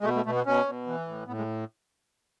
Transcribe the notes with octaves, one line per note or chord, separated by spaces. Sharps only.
G#3
B2 A3
A3
B2 A3
B3
B2 C#4
B2
E3
A2
A2 B3
G#3